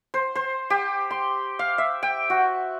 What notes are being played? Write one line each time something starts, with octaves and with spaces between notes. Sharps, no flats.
C5
C5
G4
C6
F5
E5
G5
F#4